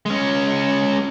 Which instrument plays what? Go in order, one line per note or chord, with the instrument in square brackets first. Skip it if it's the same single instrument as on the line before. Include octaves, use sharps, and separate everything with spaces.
[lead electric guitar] G#3 C#4